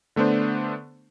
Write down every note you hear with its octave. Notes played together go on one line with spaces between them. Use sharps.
D3 A3 B3 D4 C5